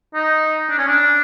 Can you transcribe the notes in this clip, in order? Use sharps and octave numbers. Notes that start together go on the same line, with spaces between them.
D#4
D4
C#4
D4